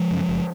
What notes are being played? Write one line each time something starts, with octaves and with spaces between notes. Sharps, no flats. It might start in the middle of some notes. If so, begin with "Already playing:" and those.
Already playing: F3 G#3
F#2 C#3
F#1